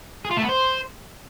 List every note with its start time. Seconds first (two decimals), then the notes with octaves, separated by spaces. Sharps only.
0.25 G#4
0.31 F4
0.37 A3
0.43 B3
0.49 C5